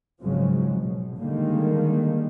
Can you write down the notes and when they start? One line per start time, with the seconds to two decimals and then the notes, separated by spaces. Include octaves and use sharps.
0.21 G#1 C#3 F3 F#3 G#3
0.76 B2
1.19 D3 D#3 G3 G#3 A#3